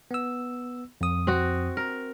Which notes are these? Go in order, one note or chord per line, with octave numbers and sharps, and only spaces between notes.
B3 E6
F2 D#6
C4 F#4
A#4